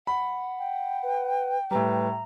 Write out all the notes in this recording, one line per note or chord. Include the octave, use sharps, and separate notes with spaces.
F#5 B5
G5
B4
A2 G3 B4 A#5